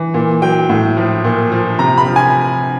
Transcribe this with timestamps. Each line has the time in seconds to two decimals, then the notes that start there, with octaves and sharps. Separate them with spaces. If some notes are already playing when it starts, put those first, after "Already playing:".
Already playing: E3
0.14 A#2
0.42 F#3 G5
0.69 A2
0.97 F3
1.24 A#2
1.52 F3
1.79 C3 A#5
1.98 B5
2.07 F3
2.16 G#5